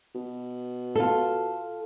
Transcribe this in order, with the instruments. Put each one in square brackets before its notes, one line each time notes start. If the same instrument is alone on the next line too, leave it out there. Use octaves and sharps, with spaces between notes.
[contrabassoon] B2
[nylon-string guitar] F4 A4